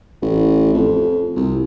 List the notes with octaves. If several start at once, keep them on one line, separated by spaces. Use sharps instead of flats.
A1
F2
C2